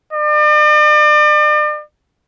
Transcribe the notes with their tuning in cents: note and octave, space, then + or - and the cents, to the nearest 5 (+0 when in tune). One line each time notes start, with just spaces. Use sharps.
D5 +40